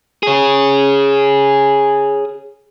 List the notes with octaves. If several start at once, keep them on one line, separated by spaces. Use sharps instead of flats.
G#4 C#5